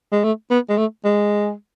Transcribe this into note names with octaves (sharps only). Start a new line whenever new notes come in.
G#3
A3
B3
G#3
A3
G#3